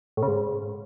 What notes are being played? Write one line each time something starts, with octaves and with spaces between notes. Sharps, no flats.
A2
C#3
G#2